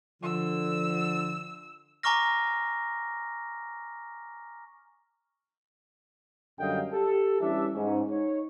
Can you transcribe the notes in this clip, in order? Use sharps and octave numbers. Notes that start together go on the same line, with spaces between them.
D3 F3 E6
G#5 A#5 C#6 D6 F6 A#6
F#2 D3 G3 D#5 F5 G5
G4 A4
E3 G3 C#4 D4 E5
G#2 C#4
D#4 C#5